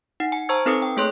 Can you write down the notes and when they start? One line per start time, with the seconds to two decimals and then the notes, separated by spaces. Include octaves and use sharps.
0.20 D#4 F#5 C7
0.32 G#5
0.49 C5 A5 A#5 C#6 E6 G#6
0.66 C4 D#4 A4 B4 D#6 C#7
0.82 G5
0.97 A3 A#3 G#4 C#5 C6 F#6